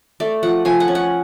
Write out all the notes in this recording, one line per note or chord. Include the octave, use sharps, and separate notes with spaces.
A3 D5
F3 F#5
F3 G#5
F#5
C#4
F#5